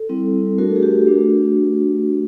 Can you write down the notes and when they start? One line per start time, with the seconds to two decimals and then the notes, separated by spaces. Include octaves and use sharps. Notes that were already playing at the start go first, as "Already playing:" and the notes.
Already playing: A4
0.09 G3 C4 E4
0.58 A3 D4 F#4 A#4
0.70 A4
0.76 G#4
0.83 G4
0.95 F#4
1.07 A3 D4 F#4